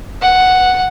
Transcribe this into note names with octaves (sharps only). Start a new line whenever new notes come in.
F#5